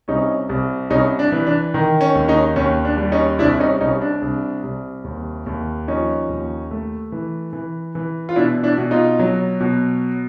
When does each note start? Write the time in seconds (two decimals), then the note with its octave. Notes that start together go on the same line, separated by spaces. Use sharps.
0.08 C2 C#4 D#4
0.49 C2
0.90 C2 C#4 D#4
1.19 D4
1.32 E3
1.47 D4
1.74 D#3
2.01 C#4
2.15 D#2
2.28 C#4 D#4
2.56 D#2 C#4
2.85 D4
2.97 G3
3.12 C#4 D#4
3.39 C2 D4 E4
3.59 C#4 D#4
3.81 C2 C#4 D#4
4.01 D4
4.22 C2
4.64 C2
5.04 D#2
5.46 D#2
5.88 F3 C#4 D#4
6.29 D#2
6.71 A3
7.12 E3
7.53 E3
7.95 E3
8.29 F4
8.36 B2 D4 E4
8.63 D4 E4
8.78 B2
8.91 D#4 F4
9.19 F#3
9.60 B2